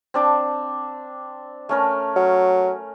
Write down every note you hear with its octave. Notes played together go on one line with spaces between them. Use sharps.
C4 D4 D6
A3 C#4 A#4
F#3